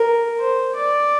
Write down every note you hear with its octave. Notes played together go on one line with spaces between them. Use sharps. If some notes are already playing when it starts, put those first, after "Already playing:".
Already playing: A#4
C5
D5